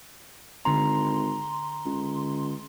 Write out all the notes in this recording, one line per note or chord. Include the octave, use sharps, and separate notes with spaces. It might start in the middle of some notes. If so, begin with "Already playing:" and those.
G#1 D3 A#5 C6
C#2